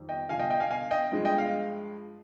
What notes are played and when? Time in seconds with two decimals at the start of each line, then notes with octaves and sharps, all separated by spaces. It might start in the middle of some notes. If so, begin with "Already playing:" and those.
Already playing: F2 D#3 G3
0.09 D#5 G5
0.29 G2 D3 F3 F5 G#5
0.39 D#5 G5
0.50 D#5 G5
0.60 F5 G#5
0.71 F5 G#5
0.91 D#5 G5
1.12 G2 F3 G#3
1.25 D#5 G5
1.38 F5